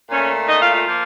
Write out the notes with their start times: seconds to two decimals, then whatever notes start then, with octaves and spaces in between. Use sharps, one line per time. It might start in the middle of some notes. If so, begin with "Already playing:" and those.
0.10 A#2 A3 C#4
0.48 D#4 D#5
0.60 F4 F5
0.73 F4 F5
0.87 F3 A#3